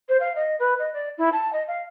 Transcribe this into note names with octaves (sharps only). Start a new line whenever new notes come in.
C5
F5
D#5
B4
D#5
D5
E4
A5
D#5
F5